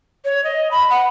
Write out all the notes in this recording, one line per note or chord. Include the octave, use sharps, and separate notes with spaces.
C#5
D#5
B5
F#5